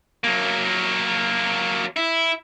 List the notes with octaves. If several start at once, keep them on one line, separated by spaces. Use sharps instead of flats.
F#3 A#3
E4